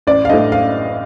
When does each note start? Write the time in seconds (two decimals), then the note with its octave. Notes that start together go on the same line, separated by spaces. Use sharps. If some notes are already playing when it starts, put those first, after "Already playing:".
0.07 A1 D5
0.25 F5
0.29 A2 A3 D4 D#5
0.52 F5